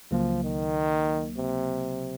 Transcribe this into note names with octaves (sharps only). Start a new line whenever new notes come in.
C#2 C#3 F3 F#3 A#3
D#3
C3